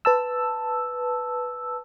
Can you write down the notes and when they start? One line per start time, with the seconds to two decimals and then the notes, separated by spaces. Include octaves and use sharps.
0.05 B4 A5 E6